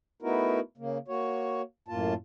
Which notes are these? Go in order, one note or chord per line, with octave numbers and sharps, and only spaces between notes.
A3 B3 D#4 E4 F#4 A#4
C#3 A#3
A#3 F#4 C#5
F#2 A2 A#3 F4 A5